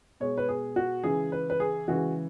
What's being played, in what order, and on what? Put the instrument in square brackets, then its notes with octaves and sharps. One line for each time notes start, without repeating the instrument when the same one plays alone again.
[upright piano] B2 G#3 C#5
B4
G#4
F#4
C#3 E3 G#3 G#4
B4
B4
G#4
C#3 E3 G#3 F#4